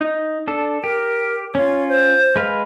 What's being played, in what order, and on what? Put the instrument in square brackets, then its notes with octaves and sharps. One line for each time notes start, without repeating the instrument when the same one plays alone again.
[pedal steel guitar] D#4
D4 A4
[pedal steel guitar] G4 [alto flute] A#4
[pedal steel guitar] C#4 F4 [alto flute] C#5
[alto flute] C5
[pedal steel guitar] G#3 B4 F5